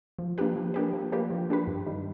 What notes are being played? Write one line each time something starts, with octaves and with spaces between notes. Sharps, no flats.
F3
A#3 D4 G4 B4
F3
A#3 D4 G4 B4
F3
A#3 D4 G4 B4
F3
A#3 D4 G4 B4
G2
D#3 G3